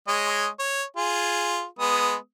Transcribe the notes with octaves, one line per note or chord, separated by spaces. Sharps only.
G#3 C#5 D#5
C#5
F4 G#4
G#3 B3 D#6